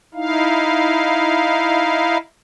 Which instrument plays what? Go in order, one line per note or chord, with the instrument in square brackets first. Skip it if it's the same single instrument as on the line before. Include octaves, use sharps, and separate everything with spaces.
[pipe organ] D#4 E4 F5